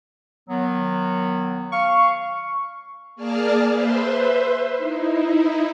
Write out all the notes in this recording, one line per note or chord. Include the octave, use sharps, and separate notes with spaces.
D#3 F#3 B3
F5 C#6
A#3 G#4 D5 A5 F6
B4 C5 E5 C6
D#4 E4